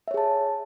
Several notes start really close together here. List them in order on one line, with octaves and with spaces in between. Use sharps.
E5 C#5 G#4 A5